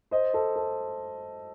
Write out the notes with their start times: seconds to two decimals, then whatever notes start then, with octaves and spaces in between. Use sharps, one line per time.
0.11 C5 D#5
0.33 A4 C5
0.56 A4